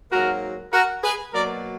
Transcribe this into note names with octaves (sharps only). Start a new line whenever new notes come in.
G#2 F#3 A#3 F#4 A#4
F#4 A#4
G#4 B4
B2 F#3 A#3 A#4 D5